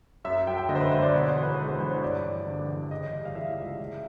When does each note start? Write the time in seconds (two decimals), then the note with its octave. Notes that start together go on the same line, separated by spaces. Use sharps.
0.25 F#2 E5
0.47 F#3 G5
0.58 G5
0.69 D3 D#5
0.75 C5
0.80 B4
0.91 G#1 C5
1.02 D5
1.14 B2 C#5
1.28 C5
1.36 E2
1.43 B4
1.58 G#3
1.69 C5
1.80 E2 C5
1.91 C#5
2.02 G2 D5
2.24 A1
2.47 D3
2.68 A1
2.91 C#3 D#5
3.13 G3
3.25 F5
3.35 E3 E5
3.58 C#2
3.79 C#3